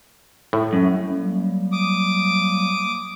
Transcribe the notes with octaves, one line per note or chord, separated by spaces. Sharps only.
A2
F#2
F#3 G3 A#3
D6 D#6